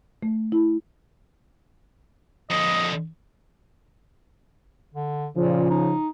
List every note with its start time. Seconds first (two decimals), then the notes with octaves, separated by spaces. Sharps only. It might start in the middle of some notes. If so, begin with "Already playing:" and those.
0.23 A3
0.52 E4
2.51 F2 D3 D#5
4.94 D3
5.37 A#2 C#3 F3
5.70 D#4